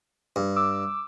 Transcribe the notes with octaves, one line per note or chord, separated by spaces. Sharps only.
G2
D6 E6